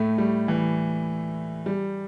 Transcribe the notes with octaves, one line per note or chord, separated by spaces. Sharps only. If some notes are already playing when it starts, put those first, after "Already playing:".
Already playing: A2 A3
G3
E3
G3